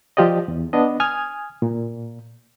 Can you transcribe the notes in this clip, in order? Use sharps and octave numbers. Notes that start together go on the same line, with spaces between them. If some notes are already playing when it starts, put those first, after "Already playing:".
F3 F4 G4 D5 D#5
E2
B3 D4 D#5
G#5 D#6 F6 G#6
A#2